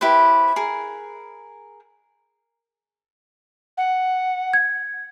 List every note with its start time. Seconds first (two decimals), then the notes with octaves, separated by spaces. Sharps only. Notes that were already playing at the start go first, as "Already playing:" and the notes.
0.01 E4 G4 B4 C5
0.56 G#4 A#4
3.78 F#5
4.54 G#6